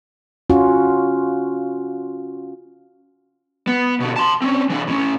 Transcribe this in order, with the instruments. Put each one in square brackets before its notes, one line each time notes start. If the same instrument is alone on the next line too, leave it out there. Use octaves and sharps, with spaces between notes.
[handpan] C#4 F4 F#4
[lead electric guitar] B3
B2 D3
A5 C6
C4 C#4
E3 D4
A2 C#4